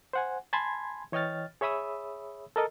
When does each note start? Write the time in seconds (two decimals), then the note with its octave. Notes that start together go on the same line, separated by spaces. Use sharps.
0.13 C5 F#5 G#5
0.53 G#5 A5 B5 C6 G#6
1.12 E3 C#5 D#5 G5 F6 A6
1.61 G#4 C#5 E5 B5 D#6 E6
2.56 A4 A#4 D#5